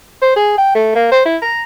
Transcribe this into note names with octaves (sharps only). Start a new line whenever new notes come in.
C5
G#4
G5
A3
A#3
C5
E4
A#5